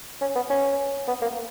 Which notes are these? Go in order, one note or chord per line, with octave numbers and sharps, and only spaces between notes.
C#4
B3
C#4
B3
A#3